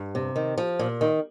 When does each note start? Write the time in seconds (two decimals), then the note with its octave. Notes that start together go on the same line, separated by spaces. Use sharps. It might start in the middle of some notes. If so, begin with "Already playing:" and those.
Already playing: G2
0.15 C3
0.36 D#3
0.58 F3
0.79 A#2
1.01 D#3